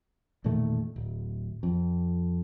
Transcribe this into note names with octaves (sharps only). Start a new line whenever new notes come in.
E1 A#2 D#3 A3
D1
F2